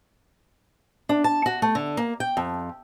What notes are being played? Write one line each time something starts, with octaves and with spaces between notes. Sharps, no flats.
D4
A5
F#4
A3
D3
A#3
G5
F2